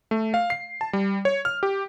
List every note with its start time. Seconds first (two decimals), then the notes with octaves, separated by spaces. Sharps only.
0.11 A3
0.34 F5
0.50 C7
0.81 A5
0.93 G3
1.25 C#5
1.45 F6
1.63 G4